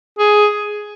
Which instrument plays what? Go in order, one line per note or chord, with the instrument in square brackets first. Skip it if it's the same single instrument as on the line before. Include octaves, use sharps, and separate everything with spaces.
[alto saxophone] G#4